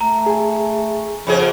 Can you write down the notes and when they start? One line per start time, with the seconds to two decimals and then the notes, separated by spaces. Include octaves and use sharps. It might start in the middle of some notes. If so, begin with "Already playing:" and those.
0.01 A3 A#5
0.26 G#4 G#5
1.27 F2 C#3 F3 G#4 B5